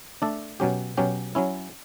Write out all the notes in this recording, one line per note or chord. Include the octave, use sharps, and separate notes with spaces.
A3 D4 A4 D5
B2 F#3 C#4 G4
B2 F#3 C#4 G4
F#3 C#4 E4